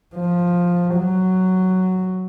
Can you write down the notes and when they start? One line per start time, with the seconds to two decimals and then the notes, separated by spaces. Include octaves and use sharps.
0.16 F3
0.95 F#3